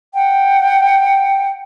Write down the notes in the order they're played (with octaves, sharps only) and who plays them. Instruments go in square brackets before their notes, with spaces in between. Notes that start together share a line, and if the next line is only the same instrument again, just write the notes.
[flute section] F#5 G5